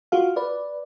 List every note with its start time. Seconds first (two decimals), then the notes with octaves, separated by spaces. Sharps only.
0.12 F4 F#4 F5
0.36 B4 D5